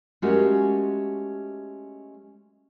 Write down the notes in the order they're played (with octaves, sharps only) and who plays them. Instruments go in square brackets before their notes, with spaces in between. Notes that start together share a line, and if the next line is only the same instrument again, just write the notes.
[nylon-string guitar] G#3 A3 C#4 F#4 G4 A#4